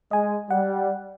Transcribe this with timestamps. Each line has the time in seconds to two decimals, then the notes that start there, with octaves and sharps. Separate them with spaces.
0.11 G#3 D#5 G#5
0.50 G3 F#5